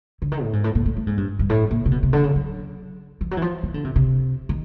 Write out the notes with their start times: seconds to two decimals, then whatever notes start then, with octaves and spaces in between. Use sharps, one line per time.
0.22 D3
0.32 D#3
0.42 A2
0.53 G#2
0.64 A2
0.75 A#2
0.86 A2
0.97 A2
1.07 G#2
1.17 G2
1.39 G2
1.50 A2
1.71 A#2
1.86 C3
1.92 B2
2.03 C3
2.13 D3
2.24 C#3
2.35 F#3
3.21 F3
3.31 F#3
3.37 E3
3.42 F3
3.63 D#3
3.74 D3
3.84 C3
3.96 C3
4.49 D#3